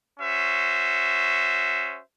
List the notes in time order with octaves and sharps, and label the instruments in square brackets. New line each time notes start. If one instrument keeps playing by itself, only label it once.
[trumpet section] C#4 F#4 C5 E5